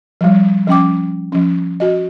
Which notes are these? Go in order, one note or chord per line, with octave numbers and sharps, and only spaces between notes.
F3 G3
F3 C#4 G5 D6
F3 C#4
F#4 D#5